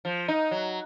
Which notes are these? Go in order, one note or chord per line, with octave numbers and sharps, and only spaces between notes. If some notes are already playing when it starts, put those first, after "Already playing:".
F3
D#4
F#3